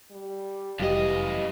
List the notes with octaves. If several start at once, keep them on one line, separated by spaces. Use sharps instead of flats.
G3
F1 F#2 E3 G3 G4 D#5 F5